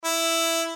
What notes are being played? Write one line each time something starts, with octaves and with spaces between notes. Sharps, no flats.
E4